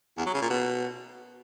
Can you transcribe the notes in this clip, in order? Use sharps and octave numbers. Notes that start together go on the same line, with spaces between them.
E2
F#3
C#3
A#2
B2